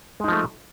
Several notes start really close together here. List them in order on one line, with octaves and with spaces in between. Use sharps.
G#3 D#4 F3 A3